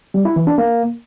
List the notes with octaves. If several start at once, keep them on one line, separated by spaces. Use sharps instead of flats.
G3
E4
E3
D4
A#3